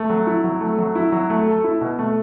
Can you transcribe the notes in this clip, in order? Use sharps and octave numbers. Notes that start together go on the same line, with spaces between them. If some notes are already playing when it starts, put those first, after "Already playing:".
Already playing: A3
F#3
E4
F#3
A3
F#3
E4
F#3
A3
A4
E4
B2
A3